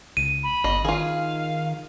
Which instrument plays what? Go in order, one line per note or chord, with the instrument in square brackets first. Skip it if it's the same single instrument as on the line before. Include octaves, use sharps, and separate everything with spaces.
[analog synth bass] C#2 [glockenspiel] D#7
[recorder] B5
[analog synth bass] G1 [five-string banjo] D#5
[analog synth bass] D#3 [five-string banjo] F4 G#4 [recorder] F5